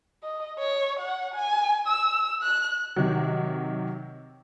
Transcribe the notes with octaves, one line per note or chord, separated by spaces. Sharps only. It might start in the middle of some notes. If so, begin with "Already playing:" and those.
D#5
C#5
F#5
G#5
E6
F#6
C3 D#3 F#3